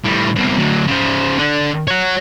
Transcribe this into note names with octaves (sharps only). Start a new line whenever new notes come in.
A2 G3
C2 B2
D2 F#3
C#3 C5
D3 D4
C#5 F#5